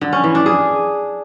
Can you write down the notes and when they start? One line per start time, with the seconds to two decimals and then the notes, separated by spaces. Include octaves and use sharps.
0.01 D3
0.13 C#4
0.24 E3
0.35 D4
0.46 G#4